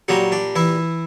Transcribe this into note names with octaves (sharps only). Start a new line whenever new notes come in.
A#2 F#3 G3 F#4
D4
E3 E4